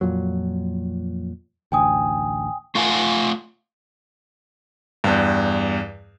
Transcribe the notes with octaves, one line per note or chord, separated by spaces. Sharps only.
F2 A#2 F#3
A1 D2 G5 G#5 D#6
A3 F4 F5 F#5 G#5
E2 G2